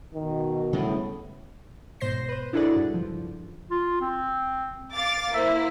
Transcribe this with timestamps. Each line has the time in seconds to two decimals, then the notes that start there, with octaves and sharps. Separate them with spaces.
0.14 B2 D#3
0.73 A2 C#3 G3 G#3 B3
2.00 G#2 B2 C5 G6 A#6 C7
2.28 B4 C5
2.53 D4 E4 F#4 G#4 A4 D5
2.76 G2
2.94 C#2 F3
3.71 F4
4.01 C4
4.93 F5 D6 A6
5.34 A#3 E4 C5 E5